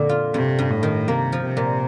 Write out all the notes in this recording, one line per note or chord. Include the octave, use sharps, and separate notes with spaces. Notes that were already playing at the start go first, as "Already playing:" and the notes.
Already playing: F2 A#2 D3
F4
G2 C3
G2
A2
D#3
C3 A#3
F3
C3
A#2